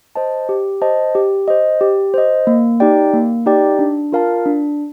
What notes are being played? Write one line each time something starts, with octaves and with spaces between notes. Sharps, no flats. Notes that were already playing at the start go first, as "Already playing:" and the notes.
C5 D#5 A5
G4
C5 D#5 A5
G4
C5 D#5
G4
C5 D#5
A#3
D#4 G4 D5 G5
A#3
D#4 G4 D5 G5
D4
F4 A#4 F5 A5
D4